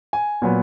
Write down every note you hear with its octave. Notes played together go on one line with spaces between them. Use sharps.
G#5
A#2 F#3 B3